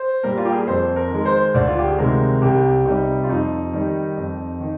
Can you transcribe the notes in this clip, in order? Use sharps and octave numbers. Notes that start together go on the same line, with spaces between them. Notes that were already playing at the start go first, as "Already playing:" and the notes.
Already playing: C5
A#2 G3 A#4
F4
G4
G#4
A#4
F2 C5
A#4
D#3 G#3
C5
D2 D5
F4
G4
G#4
C3 D#3 G#3 A#4
C2 G4
C3 G3 D#4
F4
F2 D#4
D#3 G3
F2
D#3